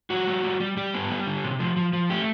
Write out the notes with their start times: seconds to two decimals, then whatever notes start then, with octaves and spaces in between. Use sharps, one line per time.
0.10 G3 F#4
0.27 G3
0.43 G3
0.60 G3
0.77 G3 G4
0.94 B3
1.10 G3
1.27 D3
1.44 C3
1.60 F3
1.76 F3
1.93 F3
2.10 A3 G4